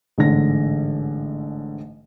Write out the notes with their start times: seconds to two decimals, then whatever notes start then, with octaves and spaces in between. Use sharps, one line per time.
0.18 A1 G#2 D3 A#6